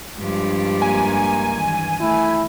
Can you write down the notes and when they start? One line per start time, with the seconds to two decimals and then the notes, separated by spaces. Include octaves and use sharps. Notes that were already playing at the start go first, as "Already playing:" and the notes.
0.18 G2 F3 G#3 D4 G4
0.82 A#3 G#5
1.55 D#3 E3
2.01 A3 E4